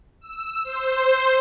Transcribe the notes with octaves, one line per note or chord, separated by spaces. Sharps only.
E6
C5